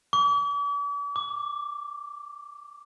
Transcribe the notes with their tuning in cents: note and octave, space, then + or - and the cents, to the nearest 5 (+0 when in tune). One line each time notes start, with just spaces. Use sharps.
D6 -45
D6 +5